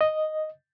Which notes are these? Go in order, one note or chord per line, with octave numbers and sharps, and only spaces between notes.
D#5